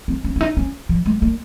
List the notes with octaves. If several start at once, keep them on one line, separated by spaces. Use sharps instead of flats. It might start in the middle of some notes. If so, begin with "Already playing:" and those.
C4
C#4
C#4
D#4
C#4
F3
G#3
A#3